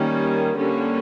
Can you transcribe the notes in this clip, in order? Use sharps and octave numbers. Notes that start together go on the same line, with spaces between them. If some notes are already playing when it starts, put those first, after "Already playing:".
Already playing: D#3 G3 A#3 C#4
D3 G3 A#3 C#4